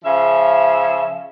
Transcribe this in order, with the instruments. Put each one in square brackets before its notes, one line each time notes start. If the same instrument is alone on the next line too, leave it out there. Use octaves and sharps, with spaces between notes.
[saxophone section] C#3 F3 E5